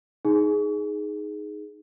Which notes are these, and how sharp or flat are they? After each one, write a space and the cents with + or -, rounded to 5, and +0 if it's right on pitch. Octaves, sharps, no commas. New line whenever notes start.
D#4 +0 G#4 +5